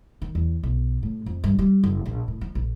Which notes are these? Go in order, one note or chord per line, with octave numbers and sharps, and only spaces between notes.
D#3
E2
B1
A2
F2
G2
G3
F#1
A#1
A2
F3
A#1